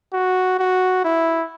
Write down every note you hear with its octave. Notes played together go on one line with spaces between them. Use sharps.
F#4
F#4
E4